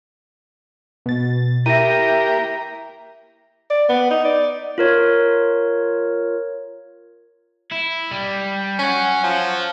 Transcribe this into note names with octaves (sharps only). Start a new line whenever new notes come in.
B2 A6
A#3 E4 G4 A#4 E5 A#6 D#7
D5
B3
D#4
D5
F4 A#4 C#5
E4
G3
C#4 C#5 F#5
F3